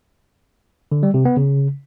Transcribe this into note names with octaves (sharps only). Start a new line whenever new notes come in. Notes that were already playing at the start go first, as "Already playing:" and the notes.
D3
G3
C3
B3
C#3